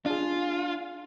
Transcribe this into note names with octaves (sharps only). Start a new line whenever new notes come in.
D4 F4 G#4